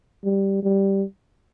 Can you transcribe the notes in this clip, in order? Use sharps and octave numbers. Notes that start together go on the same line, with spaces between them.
G3
G3